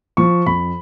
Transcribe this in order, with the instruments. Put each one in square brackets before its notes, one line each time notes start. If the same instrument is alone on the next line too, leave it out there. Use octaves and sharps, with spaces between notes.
[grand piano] F3 C#6
F2 B5